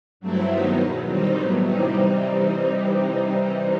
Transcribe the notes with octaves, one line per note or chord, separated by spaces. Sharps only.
G2 F#3 A3 C4 E4
D#2 D#3 F#3 B3 D#4
E2 B2 F#3
D#3 G3 C4 D#4
A2 F#3 B3
C3 E3 G3 C4 D#4